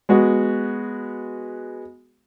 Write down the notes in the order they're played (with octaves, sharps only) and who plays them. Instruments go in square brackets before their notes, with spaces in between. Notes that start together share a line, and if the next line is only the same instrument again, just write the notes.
[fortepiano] G#3 B3 F#4